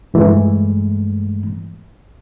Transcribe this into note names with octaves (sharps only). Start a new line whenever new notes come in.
G2 E3 G#3 A3